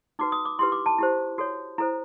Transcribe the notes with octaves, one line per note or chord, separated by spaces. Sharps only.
D#4 F#4 B4 D6
D#6
D6
E4 G4 B4 C6
D6
A5
E4 G4 C5
F#4 A4 C#5
E4 A4 C5 A#5